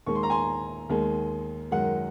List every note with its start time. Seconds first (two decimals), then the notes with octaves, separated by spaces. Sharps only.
0.06 D#2 D#3 G#3 C#6
0.15 C6
0.23 A#5
0.30 G#5 C6
0.89 D#2 D#3 G#3
1.71 F#2 D#3 G#3 F#5